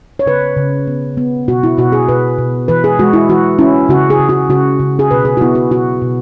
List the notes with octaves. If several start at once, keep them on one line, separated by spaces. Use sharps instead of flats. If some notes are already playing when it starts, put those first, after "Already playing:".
C#5
C#3 B4
C#3
B3
B3
B2 F#4
E4
B2 F#4
G#4
B2 B4
B2
E3 B4
G#4
G#3 F#4
E4
E3 F#4
C#4 E4
C#3 F#4
G#4
C#3
F#4
C#3 F#4
C#3
G#4
B2 B4
G#4
F#4
B3 E4
F#4
B2 F#4
B2